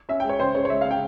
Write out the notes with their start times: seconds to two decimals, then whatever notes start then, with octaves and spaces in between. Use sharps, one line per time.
0.09 C#4 E5
0.20 G#3 G5
0.29 C#5
0.40 C#3 C5
0.55 C#3 C#5
0.65 C#5
0.70 G#3 E5
0.81 C#3 F5
0.91 G5